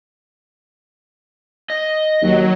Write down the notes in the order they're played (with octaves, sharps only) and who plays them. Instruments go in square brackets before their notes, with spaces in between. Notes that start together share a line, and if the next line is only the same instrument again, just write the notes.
[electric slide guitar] D#5
[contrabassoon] D#2 [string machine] F#3